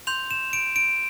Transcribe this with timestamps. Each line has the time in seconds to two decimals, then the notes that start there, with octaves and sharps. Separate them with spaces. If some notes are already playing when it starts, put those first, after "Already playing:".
0.07 C6 G6 F7
0.31 E7
0.53 D7
0.76 D7